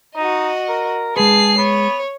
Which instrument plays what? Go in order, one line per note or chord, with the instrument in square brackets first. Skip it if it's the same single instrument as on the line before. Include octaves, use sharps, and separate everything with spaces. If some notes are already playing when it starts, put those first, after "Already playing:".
[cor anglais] D#4 [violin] F#4 D#5
[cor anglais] A#4
[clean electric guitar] G#3 B4 [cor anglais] G#4 [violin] A5 C7
[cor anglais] B3 [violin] C#5